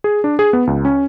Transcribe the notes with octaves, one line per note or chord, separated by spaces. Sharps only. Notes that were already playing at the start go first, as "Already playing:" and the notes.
G#4
D4
G#4
B3
C#2
C#4